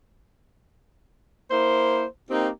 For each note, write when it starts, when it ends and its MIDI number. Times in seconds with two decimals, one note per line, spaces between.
1.51 2.05 58
1.51 2.05 64
1.51 2.05 72
2.30 2.48 58
2.30 2.48 60
2.30 2.48 63
2.30 2.48 67